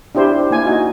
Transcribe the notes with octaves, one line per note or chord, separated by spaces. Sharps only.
D4 E4 G4 C5
A#3 E4 G#5
D#4 F#4 G#5